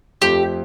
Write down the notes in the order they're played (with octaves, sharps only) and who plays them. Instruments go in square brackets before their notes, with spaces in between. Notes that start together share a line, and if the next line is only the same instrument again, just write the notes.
[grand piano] F2 F3 A3 C4 F4 [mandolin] G4